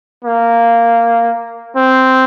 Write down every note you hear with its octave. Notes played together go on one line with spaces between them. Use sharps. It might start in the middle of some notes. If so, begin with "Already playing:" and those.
A#3
C4